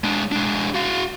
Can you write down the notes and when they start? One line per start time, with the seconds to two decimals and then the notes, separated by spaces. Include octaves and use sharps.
0.04 G#3 D4
0.32 G#3 D4
0.75 F#4 F5